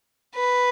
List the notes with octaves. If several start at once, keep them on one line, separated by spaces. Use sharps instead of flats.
B4